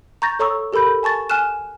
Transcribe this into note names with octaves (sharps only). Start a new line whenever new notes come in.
A#5 C#6 G6 A6 A#6
A4 C#5 A#5 C#6 D#6 E6
G4 A4 A#4 B5 G6
G#5 A5 C#6 A6
G#5 F6 F#6 E7